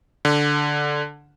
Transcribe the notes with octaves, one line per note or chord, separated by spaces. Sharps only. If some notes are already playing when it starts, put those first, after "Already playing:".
D3